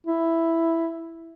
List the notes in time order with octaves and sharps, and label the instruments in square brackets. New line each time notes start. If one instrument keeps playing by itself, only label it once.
[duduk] E4